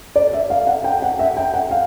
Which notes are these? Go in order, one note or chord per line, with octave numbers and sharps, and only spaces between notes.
D5
E5
F5
F#5
G5
F#5
E5
G5
F#5
F5